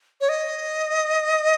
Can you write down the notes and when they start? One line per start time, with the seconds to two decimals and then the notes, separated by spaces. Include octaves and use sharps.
0.21 C#5
0.29 D#5